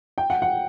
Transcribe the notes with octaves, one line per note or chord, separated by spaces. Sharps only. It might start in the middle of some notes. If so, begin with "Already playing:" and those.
G5
F#5
F#5